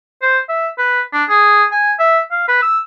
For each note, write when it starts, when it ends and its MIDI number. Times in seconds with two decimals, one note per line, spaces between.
0.22 0.38 72
0.49 0.68 76
0.78 1.01 71
1.13 1.24 62
1.29 1.64 68
1.72 1.92 80
1.99 2.20 76
2.31 2.46 77
2.48 2.59 71
2.62 2.78 88